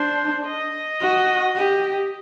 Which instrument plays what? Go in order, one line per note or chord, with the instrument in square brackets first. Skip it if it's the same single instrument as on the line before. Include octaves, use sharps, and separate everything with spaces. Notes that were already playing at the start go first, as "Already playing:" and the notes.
Already playing: [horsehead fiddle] D4 [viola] C5
[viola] D#5
[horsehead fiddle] F#4
G4